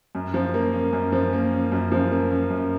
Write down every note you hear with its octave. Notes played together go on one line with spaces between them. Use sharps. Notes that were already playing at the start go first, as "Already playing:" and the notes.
F#2
F3
A#3
C#4
F#2
F3
A#3
C#4
F#2
F3
A#3
C#4
F#2